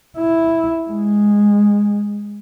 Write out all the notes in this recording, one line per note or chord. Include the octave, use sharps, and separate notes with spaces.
E4
G#3